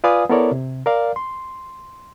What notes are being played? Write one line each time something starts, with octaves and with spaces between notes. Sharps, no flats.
F4 B4 D5 F5 G#5 D#6
B3 E4 A4 A#4 C#5 D5
C3
A#4 D5 F5
C6